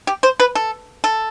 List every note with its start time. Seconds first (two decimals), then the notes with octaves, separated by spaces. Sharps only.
0.07 G4
0.23 C5
0.40 B4
0.55 A4
1.04 A4